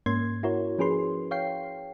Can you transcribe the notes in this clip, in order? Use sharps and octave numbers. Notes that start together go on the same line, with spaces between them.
G#2 A#3 C#4 C6 G#6
E4 F#4 A#4 C#5
F3 C#4 G#4 B4 C6
C#5 F5 G5 C7